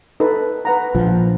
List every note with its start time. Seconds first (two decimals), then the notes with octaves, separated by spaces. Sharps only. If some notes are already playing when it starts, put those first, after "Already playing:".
0.20 D#4 A4 B4
0.65 B4 F#5 A#5
0.94 A#1 F3